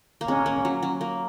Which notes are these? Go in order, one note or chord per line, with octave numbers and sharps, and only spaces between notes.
A#3
G#3 C#4
A#3
F#3
F#3
A#3